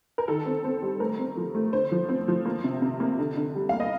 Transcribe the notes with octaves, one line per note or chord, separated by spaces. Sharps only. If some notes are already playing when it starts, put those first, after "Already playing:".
A#4
D#3 A4
C4
C4
G3
A3 A#4
C4
F3
A3
D3 C5
F3
C4
F3
A#3
C3
C3
A#3
D3
D3
G3
A#3 F5
D#5